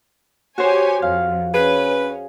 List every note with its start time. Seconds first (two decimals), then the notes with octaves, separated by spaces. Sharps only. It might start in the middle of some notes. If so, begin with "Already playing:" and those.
0.58 F#4 G4 C5 C#5 G#5
1.02 F2 F5
1.54 C#4 G#4 B4